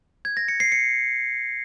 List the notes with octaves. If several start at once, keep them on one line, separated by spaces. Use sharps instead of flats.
G#6
A#6
C#7
C7
C#7